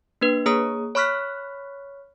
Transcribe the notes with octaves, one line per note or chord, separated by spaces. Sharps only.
A#3 D4 B4
A#3 G#4 C#5 A#5 D#6
C#5 B5 C#6 F6 F#6 B6